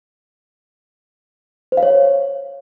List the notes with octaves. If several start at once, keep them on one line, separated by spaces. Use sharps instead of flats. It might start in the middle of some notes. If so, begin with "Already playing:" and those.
C5
F5
C#5